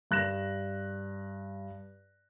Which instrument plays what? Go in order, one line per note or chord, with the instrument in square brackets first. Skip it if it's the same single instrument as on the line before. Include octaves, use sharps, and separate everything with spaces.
[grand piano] G2 F#6 A#6 E7